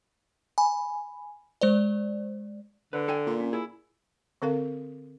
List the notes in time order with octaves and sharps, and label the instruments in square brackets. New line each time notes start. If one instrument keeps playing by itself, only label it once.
[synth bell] G#5 B5
G#3 C5 D5
[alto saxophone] D3 [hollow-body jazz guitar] B4
[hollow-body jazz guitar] A4 G5 G#5
[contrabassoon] A#2
[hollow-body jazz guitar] C#4
[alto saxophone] E4 [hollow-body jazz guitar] G#4
[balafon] D3 C4 A4 A#4 F5